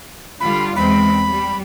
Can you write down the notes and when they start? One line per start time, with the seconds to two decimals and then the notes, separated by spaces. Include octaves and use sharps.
0.40 D3 G3 F4 B5
0.76 E2 G#3 C4 B5
1.29 G3